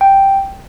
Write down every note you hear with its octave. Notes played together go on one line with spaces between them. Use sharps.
G5